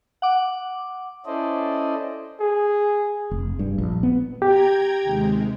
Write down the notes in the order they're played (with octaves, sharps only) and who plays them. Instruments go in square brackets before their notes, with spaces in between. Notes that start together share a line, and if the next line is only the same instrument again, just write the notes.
[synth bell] F#5 D6
[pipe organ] C#4 E4 A4 C5 D5 D#5
[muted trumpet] G#4
[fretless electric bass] F1
G2
A#1
B3
[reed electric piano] G4 [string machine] G5 A#5 G#6
[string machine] D#2 C3 G#3